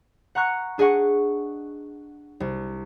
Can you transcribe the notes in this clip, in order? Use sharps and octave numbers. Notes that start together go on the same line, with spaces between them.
F#5 A#5 C#6 F#6 C#7
D4 G#4 D#5 F#5 C#6
C2